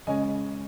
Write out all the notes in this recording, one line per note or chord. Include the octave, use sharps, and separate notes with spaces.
C#3 G#3 C#4 D#5 G#5